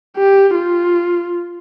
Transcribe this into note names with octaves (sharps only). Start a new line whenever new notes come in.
G4
F4